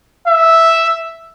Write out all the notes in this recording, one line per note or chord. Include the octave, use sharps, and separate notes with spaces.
E5